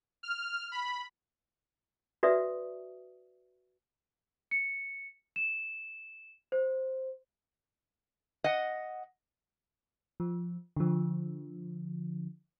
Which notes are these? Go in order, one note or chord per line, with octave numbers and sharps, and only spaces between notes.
F6
B5
F#4 B4 D5 E5 D#6
C#7
E7
C5
D#5 F#5
F3
D3 F3